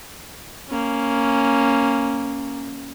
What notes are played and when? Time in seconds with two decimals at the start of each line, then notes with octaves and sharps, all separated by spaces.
0.69 A#3 C#4